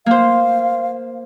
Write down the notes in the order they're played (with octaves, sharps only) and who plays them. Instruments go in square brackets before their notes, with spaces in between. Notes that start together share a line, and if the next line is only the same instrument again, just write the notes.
[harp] A#3 C5 [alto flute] F5